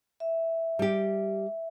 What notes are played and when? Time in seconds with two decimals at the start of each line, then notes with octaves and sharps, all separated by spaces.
0.20 E5
0.79 G3 G4